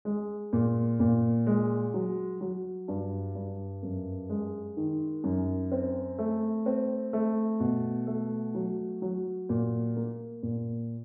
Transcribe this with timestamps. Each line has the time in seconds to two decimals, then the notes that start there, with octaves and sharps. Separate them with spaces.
0.05 G#3
0.53 A#2
1.00 A#2
1.47 G#3
1.94 F#3
2.41 F#3
2.88 G2
3.35 G2
3.83 F#2
4.29 G#3
4.77 D#3
5.24 F#2
5.72 C4
6.19 A3
6.66 C4
7.13 A3
7.60 B2
8.07 A3
8.55 F#3
9.02 F#3
9.49 A#2
9.96 A#3
10.43 A#2